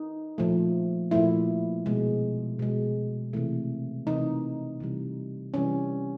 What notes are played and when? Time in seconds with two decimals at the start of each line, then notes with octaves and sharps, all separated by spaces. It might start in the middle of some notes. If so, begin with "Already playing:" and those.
Already playing: D#4
0.38 A#2 F3 A3
1.11 A#2 F3 A3 E4
1.86 B2 G#3
2.59 B2 G#3
3.33 C3 E3 A3
4.07 C3 E3 A3 D#4
4.80 C3 E3 G3
5.54 C3 E3 G3 C#4